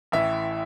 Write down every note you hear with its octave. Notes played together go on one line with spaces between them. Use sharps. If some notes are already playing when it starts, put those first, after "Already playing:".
A1 A2 E3 E5